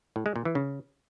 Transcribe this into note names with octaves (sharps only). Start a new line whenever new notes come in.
A2
G#3
A#2
E3
C#3